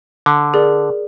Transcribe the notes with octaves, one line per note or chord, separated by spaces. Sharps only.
D3
G#4 A#4 D5